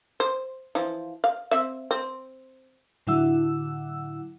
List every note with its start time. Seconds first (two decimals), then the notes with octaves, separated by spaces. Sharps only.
0.20 C5
0.75 E3 F3
1.24 F5
1.51 C4 E5
1.91 C4
3.07 A2 D3 F#3 E4 F#5 E6